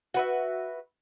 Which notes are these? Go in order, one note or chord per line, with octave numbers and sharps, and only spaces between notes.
F#4 B4 E5